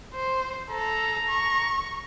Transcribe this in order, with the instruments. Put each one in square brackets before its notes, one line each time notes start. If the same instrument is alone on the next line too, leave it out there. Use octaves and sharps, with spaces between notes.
[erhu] C5
[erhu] A4 [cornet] A#5
[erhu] C#6